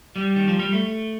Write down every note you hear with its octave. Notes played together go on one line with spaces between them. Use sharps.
G3
D#3
F3
G3
A3